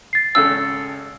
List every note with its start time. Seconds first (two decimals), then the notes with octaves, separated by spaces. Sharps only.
0.13 A6 C7
0.35 G#1 C#3 A4 E6